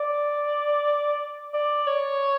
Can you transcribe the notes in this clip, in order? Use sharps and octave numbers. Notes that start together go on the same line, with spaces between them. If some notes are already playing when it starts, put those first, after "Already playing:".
Already playing: D5
D5
C#5